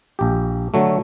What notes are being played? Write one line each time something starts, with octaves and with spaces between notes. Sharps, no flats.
A#1 G4
D3 F#3 A3